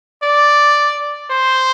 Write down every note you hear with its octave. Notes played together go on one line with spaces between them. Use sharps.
D5
C5